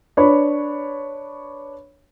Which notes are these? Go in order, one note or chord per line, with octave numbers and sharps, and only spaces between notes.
D4 B4 C#5 B5